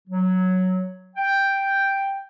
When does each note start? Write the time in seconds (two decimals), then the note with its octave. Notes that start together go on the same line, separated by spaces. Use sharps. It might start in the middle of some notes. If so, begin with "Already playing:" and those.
0.08 F#3
1.16 G5